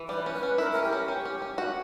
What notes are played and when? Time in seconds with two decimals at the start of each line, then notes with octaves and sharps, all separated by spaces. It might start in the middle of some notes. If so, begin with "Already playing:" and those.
Already playing: E3
0.08 G3 B4
0.26 C#4 C#5
0.33 B4
0.43 C#4
0.58 E4 A#4
0.72 C#4 A#4
0.83 G4
0.93 C#4
1.08 C#4
1.25 C#4
1.42 C#4
1.58 F#4